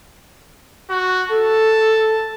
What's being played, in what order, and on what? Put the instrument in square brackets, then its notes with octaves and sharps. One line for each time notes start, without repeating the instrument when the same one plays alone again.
[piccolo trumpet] F#4
[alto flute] A4 [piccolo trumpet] A5